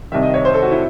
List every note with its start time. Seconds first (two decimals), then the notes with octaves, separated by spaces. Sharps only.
0.12 C2 C3 D#3 E5
0.23 D#5
0.34 C#5
0.45 C5
0.54 A4
0.62 F#4
0.71 E4